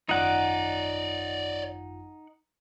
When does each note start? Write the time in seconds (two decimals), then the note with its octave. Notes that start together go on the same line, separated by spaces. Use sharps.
0.09 G#1 F#2 D#4 F4 C#5 D5 F#5